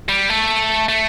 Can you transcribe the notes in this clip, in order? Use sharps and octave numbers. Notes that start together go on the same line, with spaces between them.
G3
A3
A3